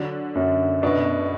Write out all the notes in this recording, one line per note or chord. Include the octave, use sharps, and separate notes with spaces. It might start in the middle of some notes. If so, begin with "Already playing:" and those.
Already playing: D3 F#3 D4
F#2
B2 B3 D4